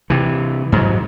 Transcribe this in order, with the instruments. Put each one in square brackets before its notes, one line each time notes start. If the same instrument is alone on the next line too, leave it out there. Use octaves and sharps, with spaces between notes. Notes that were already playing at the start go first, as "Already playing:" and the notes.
[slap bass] C3 E3
G#2 F#3